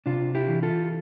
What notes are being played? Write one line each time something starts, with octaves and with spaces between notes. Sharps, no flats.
C3 D4 F4
E4 G4
E3
F4 A4